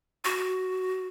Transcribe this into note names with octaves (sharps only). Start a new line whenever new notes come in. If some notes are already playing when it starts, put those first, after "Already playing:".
F#4